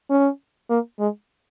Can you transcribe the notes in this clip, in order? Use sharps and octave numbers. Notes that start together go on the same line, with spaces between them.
C#4
A#3
G#3